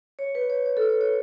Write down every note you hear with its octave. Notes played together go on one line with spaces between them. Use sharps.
C#5
B4
C#5
C#5
A4
C#5
C#5